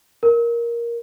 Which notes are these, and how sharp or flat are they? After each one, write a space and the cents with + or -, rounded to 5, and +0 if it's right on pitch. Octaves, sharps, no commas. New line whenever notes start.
A#4 +10